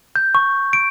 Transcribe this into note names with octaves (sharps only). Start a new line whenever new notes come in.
G6
C#6
D7